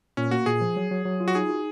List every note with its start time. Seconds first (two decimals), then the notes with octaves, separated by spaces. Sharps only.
0.17 A#2 C#4
0.31 A#3 F#4
0.46 A#2 G#4
0.61 F3
0.77 F#3
0.91 F#3
1.05 F#3
1.20 F4
1.28 F#4
1.35 D#4 G#4
1.50 F#4